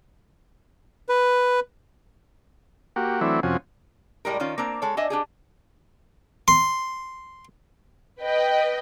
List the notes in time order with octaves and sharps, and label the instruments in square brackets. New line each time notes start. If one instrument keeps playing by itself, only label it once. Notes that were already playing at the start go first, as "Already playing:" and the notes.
[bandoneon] B4
[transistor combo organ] A#3 F#4 G4
E3 F#3 A3 C4 D4 E4
F2 C3 F3 C#4 F#4 G#5
[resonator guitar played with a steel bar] A2 G3 G#3 A#4
D#3 C#4 F4
A#3 C4 D4 A#5
G#3 A4 C#5
D4 D#5 E5 G#5
D4 G4 G#4
[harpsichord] C6
[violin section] B4 D#5 G5